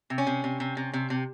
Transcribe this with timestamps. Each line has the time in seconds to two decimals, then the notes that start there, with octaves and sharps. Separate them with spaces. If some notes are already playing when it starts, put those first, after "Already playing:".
0.10 C3
0.18 C#4
0.27 C3
0.44 C3
0.60 C3
0.77 C3
0.93 C3
1.10 C3